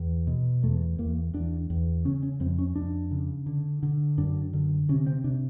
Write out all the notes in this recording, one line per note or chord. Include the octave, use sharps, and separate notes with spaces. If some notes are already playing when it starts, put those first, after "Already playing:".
Already playing: E2
B2
E2 A3
E2 A#3
E2 D4
E2
C#3 C#4
C#4
F2 C4
C#4
F2 D4
C#3
D3
D3
F#2 D4
D3
C3 C#4
C4
C3 D4